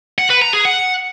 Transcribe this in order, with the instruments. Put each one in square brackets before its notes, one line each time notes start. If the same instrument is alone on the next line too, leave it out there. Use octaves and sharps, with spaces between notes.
[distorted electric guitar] F#5
B4
A#5
G#4
F#5